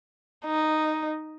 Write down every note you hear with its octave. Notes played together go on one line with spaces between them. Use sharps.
D#4